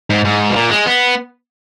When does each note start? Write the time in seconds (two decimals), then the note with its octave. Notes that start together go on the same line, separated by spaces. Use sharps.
0.10 G#2
0.25 G#2
0.50 B2
0.56 A#2
0.71 G#3
0.86 B3